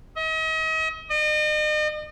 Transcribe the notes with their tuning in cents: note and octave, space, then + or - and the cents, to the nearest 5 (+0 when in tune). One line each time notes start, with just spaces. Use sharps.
D#5 +40
D#5 -40